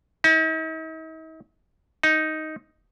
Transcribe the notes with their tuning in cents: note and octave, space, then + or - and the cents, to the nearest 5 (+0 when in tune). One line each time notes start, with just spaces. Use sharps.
D#4 +45
D#4 +5